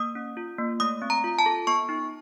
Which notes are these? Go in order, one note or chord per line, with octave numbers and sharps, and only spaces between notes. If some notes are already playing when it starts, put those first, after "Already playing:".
Already playing: A#3 D#6
C#4
F4
A#3
A3 D#6
C4
A#5
F4
A5
A4
B3 C#6
D#4